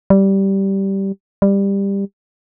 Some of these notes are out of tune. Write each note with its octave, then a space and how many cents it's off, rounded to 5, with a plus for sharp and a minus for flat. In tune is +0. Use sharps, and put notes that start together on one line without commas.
G3 -10
G3 +15